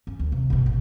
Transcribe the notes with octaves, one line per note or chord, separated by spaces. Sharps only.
C#4
D2
C3
F#1 B2
A1